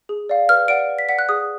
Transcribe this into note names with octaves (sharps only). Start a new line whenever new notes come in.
G#4
D5 F5
B4 F6
D5 F#5 D7
B4
B6
D5 F#5 B6
F#6
G#4 D#6